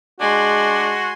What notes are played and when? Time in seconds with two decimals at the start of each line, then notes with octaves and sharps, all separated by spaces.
0.20 G#3 D4 F#4 G#5 C6